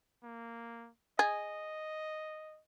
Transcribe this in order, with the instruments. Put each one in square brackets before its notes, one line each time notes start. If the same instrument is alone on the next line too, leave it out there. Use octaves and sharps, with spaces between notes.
[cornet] A#3
[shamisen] G#4 [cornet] D#5